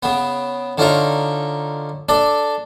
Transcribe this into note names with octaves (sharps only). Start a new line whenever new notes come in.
C#3 B3
D3 C#4 D#4 F4 A#4
D4 A4 D5